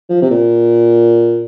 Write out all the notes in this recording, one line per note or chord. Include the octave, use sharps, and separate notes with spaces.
F3
C3
A#2